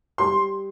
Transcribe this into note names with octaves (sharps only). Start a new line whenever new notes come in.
G3 C6